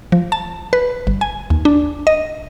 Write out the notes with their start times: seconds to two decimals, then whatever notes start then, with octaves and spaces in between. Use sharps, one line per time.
0.12 F3
0.32 A5
0.73 B4
1.07 G1
1.21 G#5
1.50 D#2
1.65 D4
2.07 D#5